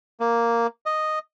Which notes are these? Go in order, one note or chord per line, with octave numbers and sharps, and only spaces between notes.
A#3
D#5